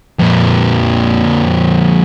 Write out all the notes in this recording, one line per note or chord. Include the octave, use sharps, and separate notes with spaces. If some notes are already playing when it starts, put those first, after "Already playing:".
F2 A#2